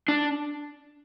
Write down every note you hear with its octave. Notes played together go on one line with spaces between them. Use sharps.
D4